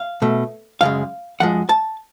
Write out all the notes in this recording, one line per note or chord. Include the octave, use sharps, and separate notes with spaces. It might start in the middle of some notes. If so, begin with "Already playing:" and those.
Already playing: F5
B2 A3
F#2 C#3 G#3 F5
F#2 F3 G#3 F#5
A5